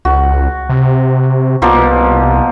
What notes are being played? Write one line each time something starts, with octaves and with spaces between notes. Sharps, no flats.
C#2 F#4
C3
C2 B2 F3 A#3